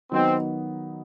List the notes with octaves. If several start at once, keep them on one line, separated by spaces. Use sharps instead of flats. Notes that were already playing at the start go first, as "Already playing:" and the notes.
D#3 F#3 B3 C4 D#4